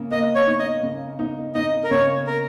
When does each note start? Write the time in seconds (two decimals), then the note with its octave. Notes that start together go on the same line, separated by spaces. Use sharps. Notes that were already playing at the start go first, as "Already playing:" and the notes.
Already playing: C#3 A#3
0.11 A#3 D#5
0.35 C#5
0.47 D#4
0.59 D#5
0.83 C#3
1.19 D#4
1.55 D#4 D#5
1.84 A#4
1.91 C#3 C#5
2.27 A#4